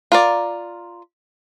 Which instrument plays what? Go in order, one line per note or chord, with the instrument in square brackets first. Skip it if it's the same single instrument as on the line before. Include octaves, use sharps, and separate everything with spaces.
[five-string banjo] F4 A#4 D5